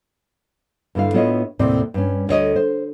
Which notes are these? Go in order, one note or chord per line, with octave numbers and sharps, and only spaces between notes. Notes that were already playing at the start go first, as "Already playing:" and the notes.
G2 D3 E4 F5
A2 B3 E4 F4 C#5 D#5
D#2 A2 C3 C4 D5
G2 C#4
D2 C#5 D#5
C5